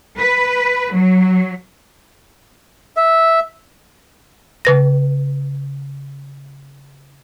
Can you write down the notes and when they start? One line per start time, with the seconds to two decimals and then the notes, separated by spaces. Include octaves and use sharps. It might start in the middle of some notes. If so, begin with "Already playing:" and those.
0.18 B4
0.93 F#3
2.97 E5
4.65 C#3 B4 A#6